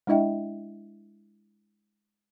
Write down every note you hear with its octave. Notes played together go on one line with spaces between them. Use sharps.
G#3 D4 E4 D#5 E5 G5